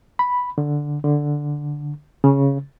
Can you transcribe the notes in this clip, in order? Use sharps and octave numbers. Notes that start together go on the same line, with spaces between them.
B5
D3
D3
C#3